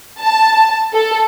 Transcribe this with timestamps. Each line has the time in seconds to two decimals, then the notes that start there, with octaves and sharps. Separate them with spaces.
0.21 A5
0.93 A4